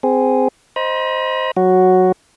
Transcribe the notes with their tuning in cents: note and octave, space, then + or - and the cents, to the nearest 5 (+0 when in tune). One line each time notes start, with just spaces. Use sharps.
C4 -20 G#4 +0
C5 +0 D#5 +5 B5 -45
F#3 -5 F#4 +0